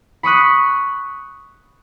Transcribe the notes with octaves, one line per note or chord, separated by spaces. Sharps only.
B5 C#6 D#6 F#6